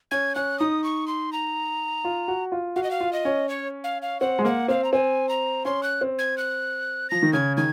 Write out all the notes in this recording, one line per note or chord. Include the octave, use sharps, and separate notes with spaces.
C#4 G#6
C#4 F#6
D#4 D#6
C#6
C6
A#5
F4
F#4
F4
F#4 F5
D#5
F5
F4
D#5
C#4
C#5
F5
F5
C4 F#5
G#3
A#3 F#5
C4 F5
A#5
C4 G#5
A#5
C#4 C6
F#6
C4
G#6
F#6
F3 A#6
D#3
C#3 G#6
D#3 G#6